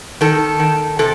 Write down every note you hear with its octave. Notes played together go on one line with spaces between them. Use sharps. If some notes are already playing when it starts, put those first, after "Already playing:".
D#3 A4
D#3
C3 A4